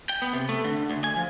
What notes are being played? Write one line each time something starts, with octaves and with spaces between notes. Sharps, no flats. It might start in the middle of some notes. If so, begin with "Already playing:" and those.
G5
B3
C3
A3
D3
D2
G#5
F3